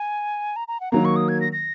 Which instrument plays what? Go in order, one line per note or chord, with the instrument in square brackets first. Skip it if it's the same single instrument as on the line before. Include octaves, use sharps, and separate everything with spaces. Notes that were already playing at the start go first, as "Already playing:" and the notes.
Already playing: [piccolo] G#5
A#5
A#5
F#5
[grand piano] D#3 F#3 A#3 [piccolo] A#5
[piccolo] C#6
D#6
G#6
A#6
A#6